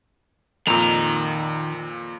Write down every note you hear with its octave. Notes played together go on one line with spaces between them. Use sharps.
F2 A#2 D#3 A#5